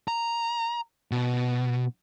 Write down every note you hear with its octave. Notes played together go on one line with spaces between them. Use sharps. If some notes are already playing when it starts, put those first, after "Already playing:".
A#5
B2